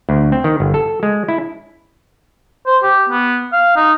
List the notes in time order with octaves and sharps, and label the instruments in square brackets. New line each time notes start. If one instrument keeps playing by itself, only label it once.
[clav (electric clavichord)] D2
C4
D#3
G1
A4
G#3
E4
[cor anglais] C5
G4
B3
F5
D#4